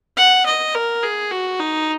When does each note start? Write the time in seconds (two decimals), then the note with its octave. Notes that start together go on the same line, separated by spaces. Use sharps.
0.17 F#5
0.46 D#5
0.75 A#4
1.03 G#4
1.31 F#4
1.60 D#4